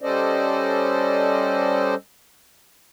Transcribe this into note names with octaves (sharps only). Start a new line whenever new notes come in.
G3 C#4 A4 C5 D5 D#5